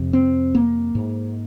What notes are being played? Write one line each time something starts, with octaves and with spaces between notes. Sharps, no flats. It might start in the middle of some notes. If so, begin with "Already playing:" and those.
Already playing: F2 C3
C4
A#3
G#2